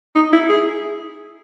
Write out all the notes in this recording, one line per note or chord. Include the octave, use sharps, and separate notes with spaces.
D#4
E4
G#4